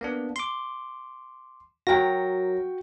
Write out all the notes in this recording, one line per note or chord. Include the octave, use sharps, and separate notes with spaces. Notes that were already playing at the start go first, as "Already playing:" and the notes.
A#3 B3 D4
C6 D6
F#3 F#4 A#4 G5 A#6